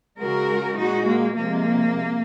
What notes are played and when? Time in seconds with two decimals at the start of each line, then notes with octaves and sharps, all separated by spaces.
0.20 C#3 G#3 F#4 A#4
0.79 A#2 G#3 D#4 F#4
1.08 A#3
1.38 C3 F3 G#3 A#3